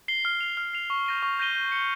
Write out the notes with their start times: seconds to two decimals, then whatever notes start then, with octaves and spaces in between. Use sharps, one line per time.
0.08 C7 G7
0.25 F6
0.41 C7 F7
0.57 F6
0.74 C7 F7
0.90 C#6
1.06 G6 A#6 D#7 G7
1.23 C#6
1.39 G6 A#6 D#7 G7
1.56 G6
1.72 C#7 G7